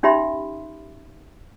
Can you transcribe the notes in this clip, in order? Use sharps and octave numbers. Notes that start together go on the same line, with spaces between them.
C#4 D#4 G4 E5 B5 C6